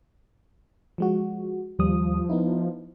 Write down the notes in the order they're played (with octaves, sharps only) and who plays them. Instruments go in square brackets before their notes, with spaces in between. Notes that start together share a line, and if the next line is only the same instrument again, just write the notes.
[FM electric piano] F3 G#3 F#4
[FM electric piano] D#2 G3 D#6 [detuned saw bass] F3
[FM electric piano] B3 D#4 E4